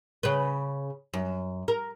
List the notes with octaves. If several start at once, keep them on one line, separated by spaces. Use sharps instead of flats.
C#3 B4
F#2
A#4